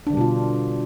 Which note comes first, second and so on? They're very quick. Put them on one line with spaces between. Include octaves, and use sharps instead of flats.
D4 D3 G3 B2 F4